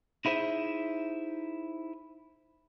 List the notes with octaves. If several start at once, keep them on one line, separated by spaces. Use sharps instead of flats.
D#4 E4 G#4 C5 E5